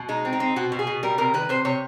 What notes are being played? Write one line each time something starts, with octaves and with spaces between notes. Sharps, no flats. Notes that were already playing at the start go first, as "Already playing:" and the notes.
Already playing: B2
G#3 D#4
C4
D#4
C4
B2 F#4
B2
G#4
B2
G3 A#4
C3 A#4
D#3 B4
C3 C5
C3 C#5